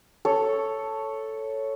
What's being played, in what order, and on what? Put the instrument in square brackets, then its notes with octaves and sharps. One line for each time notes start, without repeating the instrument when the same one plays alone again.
[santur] A4 C#5